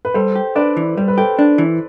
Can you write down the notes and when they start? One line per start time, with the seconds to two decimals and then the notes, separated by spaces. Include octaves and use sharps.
0.05 B4
0.14 G3 A4 C5
0.36 G4
0.56 D4 B4 D5
0.77 E3
0.97 G3 C5
1.08 B4
1.18 G4 A4 C5
1.39 D4
1.58 E3